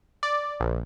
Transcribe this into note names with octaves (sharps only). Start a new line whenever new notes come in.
D5
A#1